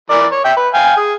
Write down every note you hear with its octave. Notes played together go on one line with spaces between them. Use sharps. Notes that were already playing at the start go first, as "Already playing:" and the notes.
E3 A#4 D5
C#5
E5 G5
B4
F5 G5 G#5
G#4